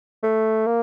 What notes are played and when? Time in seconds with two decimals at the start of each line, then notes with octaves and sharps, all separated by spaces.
0.23 A3
0.66 A#3